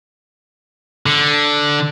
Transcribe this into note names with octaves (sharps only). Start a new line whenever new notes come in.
D3